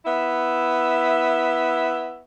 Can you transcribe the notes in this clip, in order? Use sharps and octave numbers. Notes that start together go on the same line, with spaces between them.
B3 E4 E5